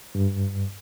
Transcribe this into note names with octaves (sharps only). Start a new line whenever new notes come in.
G2